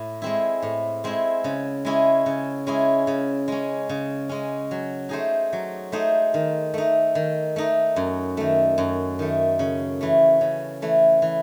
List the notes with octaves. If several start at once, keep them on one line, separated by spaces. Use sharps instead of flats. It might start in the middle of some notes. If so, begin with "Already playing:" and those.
Already playing: A2
G#3 C4 E4
A2
G#3 C4 E4
C#3
G#3 C#4 E4 G#4
C#3
G#3 C#4 E4 G#4
C#3
G#3 C#4
C#3
G#3 C#4
F#3
A3 D#4 G#4 C5
F#3
A3 D#4 G#4 C5
D#3
A3 D#4
D#3
A3 D#4
F#2
D#3 A3
F#2
D#3 A3
C#3
E3 A3
C#3
E3 A3
E3